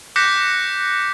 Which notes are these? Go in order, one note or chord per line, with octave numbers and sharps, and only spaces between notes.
D6 F#6 G6 A#6 B6 C#7